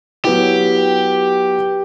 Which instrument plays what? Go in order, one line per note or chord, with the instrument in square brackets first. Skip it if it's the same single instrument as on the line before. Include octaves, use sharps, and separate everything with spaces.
[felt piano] F#3 B3 E4 [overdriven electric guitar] G4